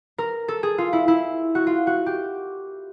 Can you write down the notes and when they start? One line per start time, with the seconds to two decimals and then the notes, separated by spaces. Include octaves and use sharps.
0.18 A#4
0.48 A4
0.63 G#4
0.78 F4
0.93 E4
1.08 E4
1.55 F#4
1.67 F4
1.87 F#4
2.06 G4